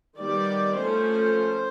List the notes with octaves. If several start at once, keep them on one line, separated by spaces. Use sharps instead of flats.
D#3 G3 B3 D5
F3 A3 C#4 C5